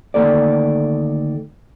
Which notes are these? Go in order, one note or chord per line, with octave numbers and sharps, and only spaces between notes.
D2 D#3 A#3 A4 D5